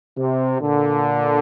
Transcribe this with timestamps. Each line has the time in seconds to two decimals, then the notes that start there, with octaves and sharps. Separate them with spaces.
0.17 C3
0.61 A#2 D3